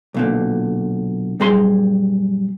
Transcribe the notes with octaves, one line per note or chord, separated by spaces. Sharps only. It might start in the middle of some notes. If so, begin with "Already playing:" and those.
B1 A#2 D3
F#2 A#2 G3 G#4 A#5 C6